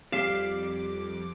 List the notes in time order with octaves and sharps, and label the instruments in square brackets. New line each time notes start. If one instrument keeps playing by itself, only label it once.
[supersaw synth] F2 D6 [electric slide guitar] G3 G4 [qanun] F5 [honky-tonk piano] B6 C7 E7